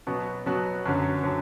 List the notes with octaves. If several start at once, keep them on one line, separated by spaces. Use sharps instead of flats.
B2 F#3 B3 F#4
B2 F#3 B3 F#4
F#2 D3 F#3
D3 F#3